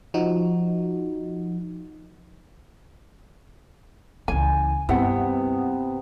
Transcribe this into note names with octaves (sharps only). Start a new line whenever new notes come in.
F3 D#4 F#4
C#2 E3 G#5
G2 C3 B3 E4 F#5